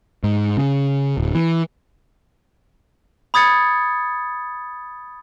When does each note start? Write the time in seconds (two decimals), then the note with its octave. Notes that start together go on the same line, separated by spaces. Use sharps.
0.24 G#2
0.57 C#3
1.18 D1
1.35 E3
3.34 B5 D#6 G#6 A6 C#7